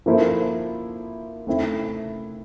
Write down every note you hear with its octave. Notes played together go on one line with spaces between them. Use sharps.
F3 A#3 E4 A4 C5
A3 C4 E4